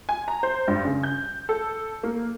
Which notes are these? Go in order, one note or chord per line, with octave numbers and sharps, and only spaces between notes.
G#5
A#5
C5
G2
C#3
G6
A4
A#3